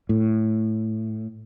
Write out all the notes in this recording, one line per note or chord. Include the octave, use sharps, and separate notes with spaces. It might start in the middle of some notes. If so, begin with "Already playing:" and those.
A2